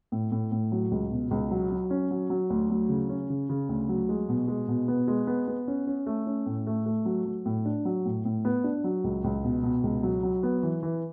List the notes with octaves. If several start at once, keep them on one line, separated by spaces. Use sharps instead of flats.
A2
A2
A2
F#3
C#2
B2
C#2
F#3
F#3
C#4
F#3
F#3
D2
F#3
C#3
C#4
C#3
C#3
D2
F#3
G#3
B2
G#3
B2
B3
G#3
B3
B3
C#4
C#4
A3
C#4
A2
A3
A3
F#3
F#3
A2
D4
F#3
A2
A2
B3
D4
F#3
C#2
C#2
B2
B2
C#2
F#3
F#3
B3
E3
E3